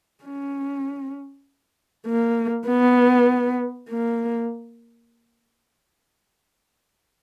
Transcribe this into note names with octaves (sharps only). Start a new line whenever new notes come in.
C#4
A#3
B3
A#3